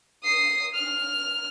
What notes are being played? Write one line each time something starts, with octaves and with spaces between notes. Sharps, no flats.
D#6 C7
F6